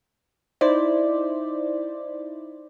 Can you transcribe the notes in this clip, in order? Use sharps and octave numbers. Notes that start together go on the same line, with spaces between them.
D#4 E4 C5 D5